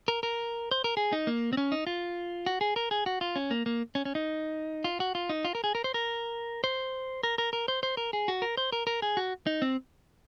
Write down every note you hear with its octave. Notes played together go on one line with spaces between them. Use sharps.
A#4
A#4
C5
A#4
G#4
D#4
A#3
C4
C#4
D#4
F4
F#4
G#4
A#4
G#4
F#4
F4
C#4
A#3
A#3
C#4
C#4
D#4
F4
F#4
F4
D#4
F4
A#4
G#4
A#4
C5
A#4
C5
A#4
A#4
A#4
C5
C5
A#4
G#4
F#4
A#4
C5
A#4
A#4
G#4
F#4
D#4
C4